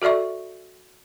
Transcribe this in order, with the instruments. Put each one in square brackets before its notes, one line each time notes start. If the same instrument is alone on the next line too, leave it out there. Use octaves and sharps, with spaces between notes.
[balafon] F#4 A4 D5 E5 C#6